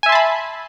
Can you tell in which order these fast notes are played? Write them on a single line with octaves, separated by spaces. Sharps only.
G#5 E5 C6 A5 B5